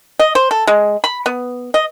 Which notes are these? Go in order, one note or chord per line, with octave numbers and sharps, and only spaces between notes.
D#5
C5
A4
G#3
B5
B3
D#5